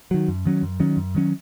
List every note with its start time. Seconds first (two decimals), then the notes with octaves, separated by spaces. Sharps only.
0.11 D#3 F#3
0.28 F#2
0.45 D#3 F#3 C#4
0.63 F#2
0.80 D#3 F#3 C#4
0.97 F#2
1.15 D#3 F#3 C#4